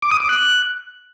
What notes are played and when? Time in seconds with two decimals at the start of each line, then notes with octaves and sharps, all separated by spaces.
0.02 D6
0.11 D#6
0.20 D6
0.29 F#6